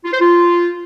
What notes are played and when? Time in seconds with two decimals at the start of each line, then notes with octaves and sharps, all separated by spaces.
0.05 F4
0.13 C5
0.20 F4